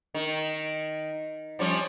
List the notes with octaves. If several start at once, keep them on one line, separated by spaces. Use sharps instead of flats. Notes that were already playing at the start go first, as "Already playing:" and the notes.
D#3
F3 G3 C#4